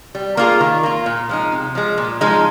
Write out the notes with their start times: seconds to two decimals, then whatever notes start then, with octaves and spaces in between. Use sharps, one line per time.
0.15 G3
0.37 A#3 F4 G#4
0.61 D#3
0.83 A#3 F4
1.06 A#2
1.29 F3 G#3 D#4
1.52 C3
1.75 F3 G#3
1.98 A#2
2.21 F3 G#3 D#4